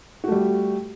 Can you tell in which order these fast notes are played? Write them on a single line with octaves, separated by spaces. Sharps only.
F#4 A3 G3